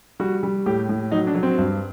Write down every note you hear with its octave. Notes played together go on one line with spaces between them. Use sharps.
G3 F#4
G3
A2 G4
A2
F#3 D#4
D4
F#3
C4
G2